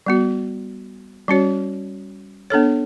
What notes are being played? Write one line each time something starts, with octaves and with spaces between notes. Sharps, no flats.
G3 B3 F#4
G3 C#4 F#4 C#5
B3 D4 A4 C#5